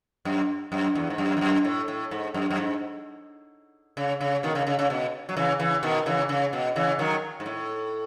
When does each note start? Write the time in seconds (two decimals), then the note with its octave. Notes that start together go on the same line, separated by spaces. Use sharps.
0.25 F#2
0.72 F#2
0.95 E2
1.10 G#2
1.18 F#2
1.37 E2
1.41 F#2
1.65 A2
1.88 A2
2.11 G#2
2.34 F#2
2.50 F#2
2.57 G#2
3.97 C#3
4.21 C#3
4.43 B2 D#3
4.55 C#3
4.67 C#3
4.79 C#3
4.90 B2
5.29 F#3
5.37 C#3 E3
5.59 C#3 E3
5.83 B2 D#3
6.06 C#3 E3
6.29 C#3
6.53 B2
6.76 C#3 E3
6.99 D#3 F#3
7.40 G#2
7.46 A2